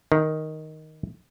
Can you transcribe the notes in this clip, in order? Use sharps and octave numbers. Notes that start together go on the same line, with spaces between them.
D#3